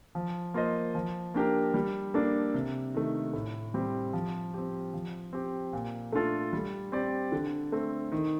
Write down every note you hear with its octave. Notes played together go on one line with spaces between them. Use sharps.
F3
A#3 F4 C5 D#5
F3
A#3 D4 G4 A#4
G3
A#3 D4 A4 D5
C3
D#3 A3
A2
G3 C4 G4
F3
C4 G4
F3
C4 G4
A#2
A3 D4 F4 A4
G3
C4 G4 D5
D3
A3 C4
D#3